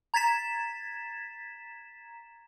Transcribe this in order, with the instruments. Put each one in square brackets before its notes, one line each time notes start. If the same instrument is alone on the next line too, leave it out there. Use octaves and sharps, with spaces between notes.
[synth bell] A#5 G#6 A6 B6 E7